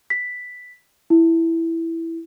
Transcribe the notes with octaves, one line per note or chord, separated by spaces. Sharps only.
B6
E4